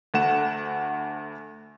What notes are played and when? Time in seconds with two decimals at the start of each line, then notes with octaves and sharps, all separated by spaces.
0.14 D2 A3 F#5 E7